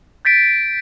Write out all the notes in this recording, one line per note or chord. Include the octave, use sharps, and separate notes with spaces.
G6 A6 B6 D7